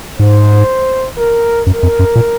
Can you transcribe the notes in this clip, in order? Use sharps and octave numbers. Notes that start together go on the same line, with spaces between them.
G#2 C5
A#4
F#2 A#4
F2
F#2
A#2